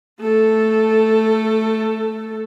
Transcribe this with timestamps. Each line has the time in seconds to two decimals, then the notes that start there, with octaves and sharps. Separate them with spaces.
0.21 A3 A4